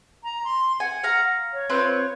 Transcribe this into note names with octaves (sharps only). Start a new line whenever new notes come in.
A#5
C6
F#5 G#5
F5 A#5
C#5
C4 F4 B4